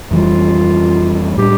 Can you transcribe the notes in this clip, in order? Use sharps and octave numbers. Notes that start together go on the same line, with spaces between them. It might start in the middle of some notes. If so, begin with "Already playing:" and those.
F2 E3 G3 F4
A2 G3 D4 G4